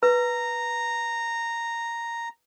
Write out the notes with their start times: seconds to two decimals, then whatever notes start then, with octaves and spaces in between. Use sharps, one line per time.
0.03 B4 A#5